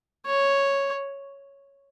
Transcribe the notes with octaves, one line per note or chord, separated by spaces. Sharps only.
C#5